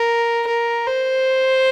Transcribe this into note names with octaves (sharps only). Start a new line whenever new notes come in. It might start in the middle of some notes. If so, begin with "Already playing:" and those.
Already playing: A#4
A#4
C5